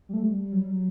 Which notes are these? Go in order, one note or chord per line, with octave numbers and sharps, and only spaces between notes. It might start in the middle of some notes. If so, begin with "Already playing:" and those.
G3
A3
G3
F#3
G3
F#3